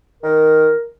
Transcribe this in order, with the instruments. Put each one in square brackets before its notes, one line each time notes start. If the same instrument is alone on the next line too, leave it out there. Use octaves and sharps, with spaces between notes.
[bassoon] D#3 [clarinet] A#4